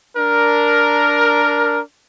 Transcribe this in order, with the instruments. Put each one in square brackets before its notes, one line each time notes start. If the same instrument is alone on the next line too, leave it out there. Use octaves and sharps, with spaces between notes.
[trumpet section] D4 A#4